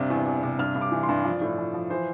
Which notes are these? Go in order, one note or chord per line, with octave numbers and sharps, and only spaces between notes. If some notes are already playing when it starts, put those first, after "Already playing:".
Already playing: G2 C3
E2
E2
C3
G2 F6
G2
D6
E3
C6
G2
F3 D5
A2
F3
F3
E3 C5